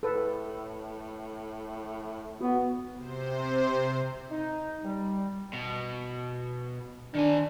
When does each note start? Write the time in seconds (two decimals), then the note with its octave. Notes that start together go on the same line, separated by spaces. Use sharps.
0.03 A2 A4 B4
2.41 B3 F#4
2.94 C3 C5
4.30 D#4
4.84 G3
5.53 B2
7.15 D#3 D4 G#5